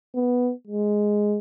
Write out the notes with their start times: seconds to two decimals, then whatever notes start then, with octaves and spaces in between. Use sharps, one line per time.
0.15 B3
0.67 G#3